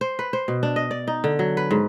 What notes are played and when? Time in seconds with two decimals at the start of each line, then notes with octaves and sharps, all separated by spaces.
0.01 C5
0.19 B4
0.33 C5
0.48 B2
0.63 D4
0.76 D#5
0.91 D5
1.07 D#4
1.24 D3
1.39 F#3
1.57 B4
1.71 G#2